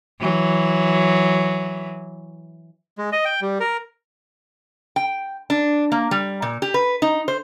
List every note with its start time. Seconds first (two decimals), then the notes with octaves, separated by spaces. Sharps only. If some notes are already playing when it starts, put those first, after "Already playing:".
0.20 E3 F#3
2.98 G#3
3.12 D#5
3.25 G5
3.42 G3
3.60 A#4
4.96 G5
5.50 D4
5.92 A#3
6.11 G3
6.42 A#2
6.62 G4
6.74 B4
7.02 D#4
7.28 C5